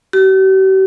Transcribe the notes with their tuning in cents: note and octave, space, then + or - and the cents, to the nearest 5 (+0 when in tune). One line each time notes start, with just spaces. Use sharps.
G4 -45